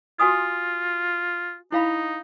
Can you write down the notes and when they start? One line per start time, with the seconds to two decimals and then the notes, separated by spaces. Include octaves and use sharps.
0.19 F4 F#4 G#5 D#6
1.72 D#4 E4 F5 B5